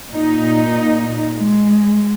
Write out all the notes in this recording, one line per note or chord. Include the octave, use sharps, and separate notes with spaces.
A#2 D#4
G#3